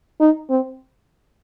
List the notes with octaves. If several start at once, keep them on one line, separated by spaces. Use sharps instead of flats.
D#4
C4